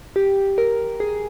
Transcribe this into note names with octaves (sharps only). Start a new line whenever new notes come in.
G4
A#4
G#4